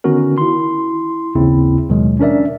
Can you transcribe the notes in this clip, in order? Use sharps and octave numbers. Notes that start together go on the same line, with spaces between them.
D3 D#3 B3 C#4 F#4 A#4
E4 C6
A1 D#2 C#3 C4 E4
D#2 B2 D#3 F#3 G#3
C#4 D4 A#4 D5 E5